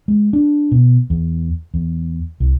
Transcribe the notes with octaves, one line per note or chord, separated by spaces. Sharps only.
G#3
D4
B2
E2
E2
C2